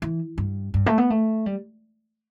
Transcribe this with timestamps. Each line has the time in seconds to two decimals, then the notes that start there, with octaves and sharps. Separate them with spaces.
0.02 E3
0.38 G2
0.74 G2
0.86 A3
0.98 B3
1.10 A3
1.46 G3